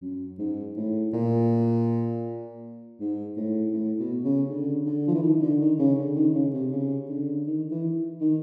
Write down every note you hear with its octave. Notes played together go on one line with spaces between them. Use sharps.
F#2
G#2
A2
A#2
G#2
A2
A2
B2
C#3
D3
D3
F3
E3
D#3
D3
D#3
C#3
D3
D#3
C#3
C3
C#3
D3
D#3
E3
D#3